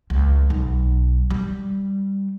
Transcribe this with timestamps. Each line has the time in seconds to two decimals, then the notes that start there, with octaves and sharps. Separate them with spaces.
0.10 C#2
0.50 B1
1.30 G3